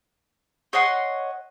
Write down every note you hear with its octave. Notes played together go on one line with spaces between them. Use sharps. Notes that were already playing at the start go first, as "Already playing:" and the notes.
C#5 D#5 F#5 C6